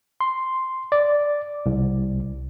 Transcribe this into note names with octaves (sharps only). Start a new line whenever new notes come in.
C6
D5
C2